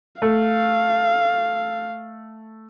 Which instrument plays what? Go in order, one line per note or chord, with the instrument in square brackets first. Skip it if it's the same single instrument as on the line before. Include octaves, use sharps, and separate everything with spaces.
[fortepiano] A3 [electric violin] F5